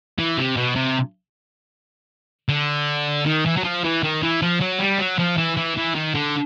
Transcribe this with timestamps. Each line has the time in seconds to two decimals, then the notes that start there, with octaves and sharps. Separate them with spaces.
0.19 E3
0.38 C3
0.57 B2
0.76 C3
2.49 D3
3.26 D#3
3.46 E3
3.57 F#3
3.64 F3
3.84 E3
4.03 D#3
4.23 E3
4.42 F3
4.61 F#3
4.79 G3
4.99 F#3
5.19 F3
5.37 E3
5.57 E3
5.77 E3
5.95 D#3
6.14 D3